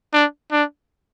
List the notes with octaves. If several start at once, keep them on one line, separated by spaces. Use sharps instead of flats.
D4
D4